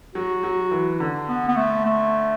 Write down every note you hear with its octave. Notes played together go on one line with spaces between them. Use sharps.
F#3 F#4
F#3
E3
D3
B3
B3
A3
A3